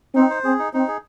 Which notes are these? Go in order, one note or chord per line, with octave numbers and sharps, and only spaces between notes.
C4 D#4
C5
C4 G#4
D#4
C4 D#4
G#4